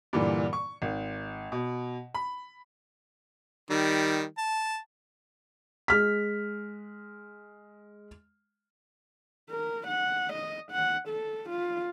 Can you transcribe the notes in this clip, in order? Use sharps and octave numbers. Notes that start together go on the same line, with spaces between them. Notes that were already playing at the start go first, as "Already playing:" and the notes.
G2 A#2 D3 E3
C#6
G#1
B2
B5
D#3 G3
A5
G#3 F6 B6
A#4
F#5
D#5
F#5
A4
F4